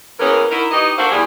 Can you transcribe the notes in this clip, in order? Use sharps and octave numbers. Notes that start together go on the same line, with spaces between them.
E3 A#3 B3 C#4 G#4 A#4
D#4 E4 F#4 A#4
E3 D#4 G4 D#5
A#3 D4 F#4 A4 C5 F5
E2 G3 G#4